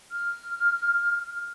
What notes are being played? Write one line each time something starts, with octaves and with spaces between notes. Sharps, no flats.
F6